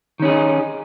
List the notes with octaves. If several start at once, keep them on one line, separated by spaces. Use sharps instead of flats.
D#3 C#4 D#4 G#4